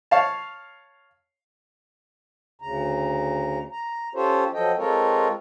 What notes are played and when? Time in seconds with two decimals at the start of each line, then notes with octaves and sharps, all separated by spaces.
0.11 C#5 F5 A5
2.62 D2 C#3 A#5
3.72 A#5
4.15 C#4 F4 G4 A4 C5 C#5
4.53 F3 F#3 A4 D#5 G5
4.77 G#3 C4 F4 A4 A#4 C#5